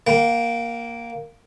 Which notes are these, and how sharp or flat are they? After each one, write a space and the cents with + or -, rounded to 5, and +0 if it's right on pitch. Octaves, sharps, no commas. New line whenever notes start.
A#3 +0 G5 -40